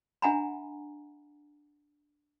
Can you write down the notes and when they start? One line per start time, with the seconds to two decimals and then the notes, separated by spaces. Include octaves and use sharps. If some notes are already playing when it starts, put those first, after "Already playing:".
0.22 D4 E5 F#5 G#5 A#5 B5